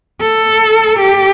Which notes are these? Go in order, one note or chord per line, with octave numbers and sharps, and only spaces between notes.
A4
G4